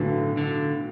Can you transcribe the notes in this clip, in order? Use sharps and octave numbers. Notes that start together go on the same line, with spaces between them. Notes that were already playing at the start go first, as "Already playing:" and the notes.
Already playing: B1 A2 D3 F#3 B3
D3